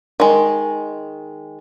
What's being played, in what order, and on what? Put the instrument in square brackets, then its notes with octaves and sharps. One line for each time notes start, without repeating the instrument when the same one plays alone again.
[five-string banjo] D#3 G#3